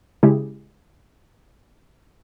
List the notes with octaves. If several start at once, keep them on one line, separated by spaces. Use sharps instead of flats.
C#3 G#3 E4 G4 G#4